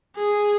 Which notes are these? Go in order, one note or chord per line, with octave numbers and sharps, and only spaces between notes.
G#4